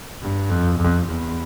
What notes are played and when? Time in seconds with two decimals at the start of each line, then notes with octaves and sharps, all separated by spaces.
0.22 G2
0.50 F2
0.77 F2
1.05 E2